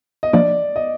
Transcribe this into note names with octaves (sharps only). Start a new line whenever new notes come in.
D#5
F3 A#3 D4 D5
D#5